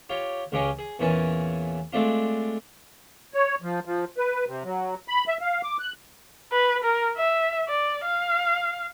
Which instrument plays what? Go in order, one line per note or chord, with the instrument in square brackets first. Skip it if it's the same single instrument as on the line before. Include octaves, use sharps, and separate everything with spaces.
[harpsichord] F4 G4 C#5
C#2 C#3 G4 G#4 C#5 D#5
G#4
E2 A#2 E3 C#4 G#5 A5
G#3 A3 C4 D4 F4
[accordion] C#5
F3
F3
B4
C3
F#3
B5
E5
F5
D6
F#6
[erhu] B4
A#4
E5
D5
F5